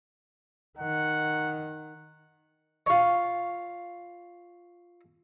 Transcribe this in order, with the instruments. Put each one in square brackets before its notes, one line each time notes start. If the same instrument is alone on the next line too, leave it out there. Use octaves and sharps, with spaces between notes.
[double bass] D#3 [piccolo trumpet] F#5
[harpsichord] F4 C#5